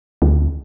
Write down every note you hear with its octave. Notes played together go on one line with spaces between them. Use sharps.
D2